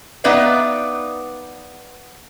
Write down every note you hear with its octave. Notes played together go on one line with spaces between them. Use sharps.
B3 D#4 B4 D5 E5 F5